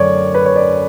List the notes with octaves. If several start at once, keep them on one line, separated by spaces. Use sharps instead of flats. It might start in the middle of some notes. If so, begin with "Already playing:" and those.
Already playing: F#2 D3 A3 C#5 D5 D6
B4
C#5
D5